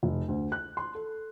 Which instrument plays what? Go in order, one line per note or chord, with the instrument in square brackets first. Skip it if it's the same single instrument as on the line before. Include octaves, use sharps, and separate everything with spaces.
[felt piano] F1
D2
F#6
C6
A4